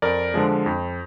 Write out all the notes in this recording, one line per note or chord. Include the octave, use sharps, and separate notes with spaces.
F2 A#4 D5
D3 F3 G#3
F2